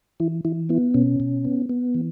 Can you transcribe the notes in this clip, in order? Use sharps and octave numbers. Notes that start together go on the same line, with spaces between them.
E3 E4
E3 E4
B3 E4
B2 C#4
B2
B3
B3
E3